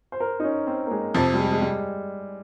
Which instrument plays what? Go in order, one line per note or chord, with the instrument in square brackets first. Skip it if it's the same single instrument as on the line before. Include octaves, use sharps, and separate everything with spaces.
[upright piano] C5
A#4
D#4
C#4
C4
A#3
G#3
[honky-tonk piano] F2 C3 F3
[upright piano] G3
G#3
G#3
G3